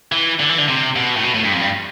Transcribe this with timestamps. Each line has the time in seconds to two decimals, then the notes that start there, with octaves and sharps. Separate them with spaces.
0.12 E3
0.40 D3
0.49 E3
0.58 D3
0.68 C3
0.96 B2
1.17 A2
1.24 B2
1.34 A2
1.44 G2
1.53 F2
1.61 G2